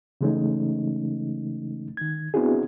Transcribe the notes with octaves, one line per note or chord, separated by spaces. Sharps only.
C#3 E3 G#3 A3 C#4 D#4
D#3 G#6
B3 C4 D4 E4 F#4 G#4